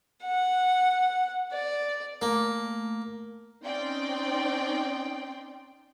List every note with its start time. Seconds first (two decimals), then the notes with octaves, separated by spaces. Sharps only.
0.23 F#5
1.52 D5
2.22 A3 A#3
3.64 C4 C#4 D#4 D5 G5 C6